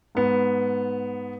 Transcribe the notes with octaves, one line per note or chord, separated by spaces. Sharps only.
G#2 B3